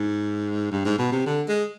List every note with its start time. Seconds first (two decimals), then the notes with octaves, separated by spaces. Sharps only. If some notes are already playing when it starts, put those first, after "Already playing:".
Already playing: G#2
0.71 G2
0.85 G#2
0.99 B2
1.12 C3
1.26 D3
1.48 G#3